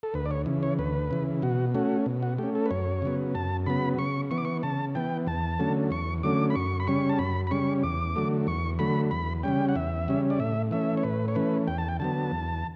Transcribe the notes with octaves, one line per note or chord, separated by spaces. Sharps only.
A4
D2 B4
D5
C#5
C#3 E3
C#5
D2 B4
C#3 E3
B2 F#4
A3 C#4 F#4
B2
F#4
A3 C#4 G4
A4
B4
F#2 C#5
C#3 F#3 B3
F#2 A5
C#3 F#3 B3 B5
C#3 C#6
E3 B3 C#6
D6
C#6
C#3 A5
E3 B3 G5
E2 A5
D3 F#3 A3 C#4
E2 C#6
D3 F#3 A3 C#4 D6
B5
F#2 C#6
B5
C#3 G3 C#4 C#6
A5
F#2 B5
B5
C#3 G3 C#4 C#6
E2 D6
D3 F#3 A3
E2 C#6
D3 F#3 A3 B5
E2 B5
C#3 G3 C#4 G5
F#5
E2 E5
C#3 G3 C#4
D5
A2 E5
E3 A3 C#4 E5
C#5
A2 B4
C#5
E3 A3 C#4 B4
E2 G5
A5
G5
D3 F#3 B3 A5
E2